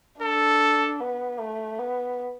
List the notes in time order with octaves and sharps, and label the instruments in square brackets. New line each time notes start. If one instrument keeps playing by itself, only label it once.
[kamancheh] D4 [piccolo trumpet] A4
[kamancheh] B3
A3
B3